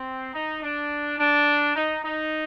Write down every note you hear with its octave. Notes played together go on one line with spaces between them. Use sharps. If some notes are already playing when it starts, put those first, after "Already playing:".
Already playing: C4
D#4
D4
D4
D#4
D#4